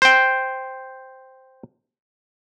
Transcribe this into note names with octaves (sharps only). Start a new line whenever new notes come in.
C5 G5